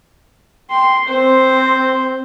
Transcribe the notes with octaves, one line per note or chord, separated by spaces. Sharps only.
G5 C6
C4 C5